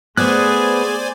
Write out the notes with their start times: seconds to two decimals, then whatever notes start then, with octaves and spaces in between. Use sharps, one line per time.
0.17 A3 B3 G#4 C5 D5 G#5 F#6